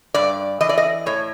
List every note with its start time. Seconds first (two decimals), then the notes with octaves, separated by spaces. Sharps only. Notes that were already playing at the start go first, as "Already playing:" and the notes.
0.14 G2 D5
0.60 E3 D#5
0.69 D5
0.78 D#5
1.06 A2 C#5